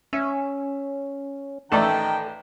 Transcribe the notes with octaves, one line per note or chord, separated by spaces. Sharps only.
C#4 E5
A1 D#3 A3 A4 D5 G5 A#5